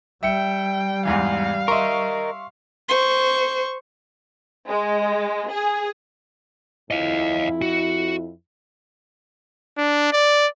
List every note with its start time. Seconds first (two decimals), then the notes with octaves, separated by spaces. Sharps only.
0.23 G3 E5 G5 C#7
1.05 E2 G#2 E3 F5
1.68 A#4 D#5 E5 C6 C#6
2.89 C5 C#6
4.67 G#3
5.49 G#4
6.91 F2 E4 D#5 F5
7.62 F#4
9.78 D4
10.12 D5